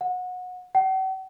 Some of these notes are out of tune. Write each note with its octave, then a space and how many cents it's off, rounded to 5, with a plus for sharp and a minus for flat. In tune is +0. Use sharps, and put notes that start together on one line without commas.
F#5 -25
F#5 +45